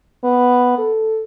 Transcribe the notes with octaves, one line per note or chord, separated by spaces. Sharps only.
B3
A4